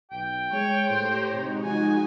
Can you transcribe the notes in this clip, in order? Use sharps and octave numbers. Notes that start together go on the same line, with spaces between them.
B1 G5
G#3 C#5
A2 G4 C5 C#5 A#5
C3 G#3 D#4 F#4
F3 G#5